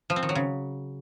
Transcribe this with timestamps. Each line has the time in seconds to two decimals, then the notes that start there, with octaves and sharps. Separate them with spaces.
0.10 F3
0.16 C4
0.23 D#3
0.29 F#3
0.35 C#3